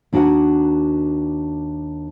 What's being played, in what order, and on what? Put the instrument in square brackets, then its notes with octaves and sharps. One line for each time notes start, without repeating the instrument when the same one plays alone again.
[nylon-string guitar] D#2 D4 F#4 A#4 F#5 G#5